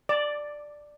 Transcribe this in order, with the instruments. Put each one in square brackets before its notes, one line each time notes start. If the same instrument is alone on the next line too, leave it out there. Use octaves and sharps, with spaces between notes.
[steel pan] D5